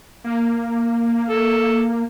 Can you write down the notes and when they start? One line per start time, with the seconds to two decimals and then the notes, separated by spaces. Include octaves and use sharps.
0.24 A#3
1.29 A4